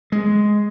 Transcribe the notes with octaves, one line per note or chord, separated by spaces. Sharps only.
G#3